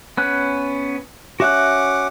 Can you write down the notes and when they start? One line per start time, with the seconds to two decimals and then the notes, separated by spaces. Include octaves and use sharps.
0.17 B3 C#4 F#6
1.40 C#4 F#4 E5 F#5 D6 F#6